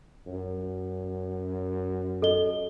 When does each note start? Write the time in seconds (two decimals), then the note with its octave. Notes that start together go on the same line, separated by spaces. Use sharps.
0.27 F#2
2.22 A4 D#5 G7